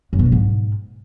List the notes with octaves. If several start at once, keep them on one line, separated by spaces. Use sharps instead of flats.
F#2
B2
F#3
G#2